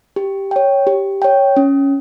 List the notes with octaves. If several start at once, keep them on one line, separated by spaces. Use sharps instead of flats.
G4
C#5 G5
G4
C#5 G5
C#4